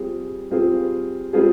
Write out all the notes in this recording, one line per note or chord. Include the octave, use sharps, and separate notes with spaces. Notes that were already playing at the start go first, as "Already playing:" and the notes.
Already playing: G3 C4 F4 G#4
G3 C4 F4 G#4
G3 C4 F4 G#4